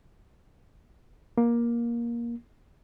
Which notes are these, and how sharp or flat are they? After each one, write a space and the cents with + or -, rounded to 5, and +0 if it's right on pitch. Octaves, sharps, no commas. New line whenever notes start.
A#3 +15